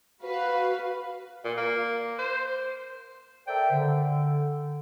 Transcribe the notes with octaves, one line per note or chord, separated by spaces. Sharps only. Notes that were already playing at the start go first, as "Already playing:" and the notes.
F#4 B4 F5
A#2
A#3
C5
A4 A#4 C5 D5 E5 G5
D3